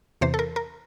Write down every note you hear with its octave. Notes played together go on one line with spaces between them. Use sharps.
E2 C3 E3 C5
A4
A#4
A#4